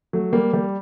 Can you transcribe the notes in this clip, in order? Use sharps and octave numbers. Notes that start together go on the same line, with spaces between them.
F#3 A3
G3 A#3
G3 A#3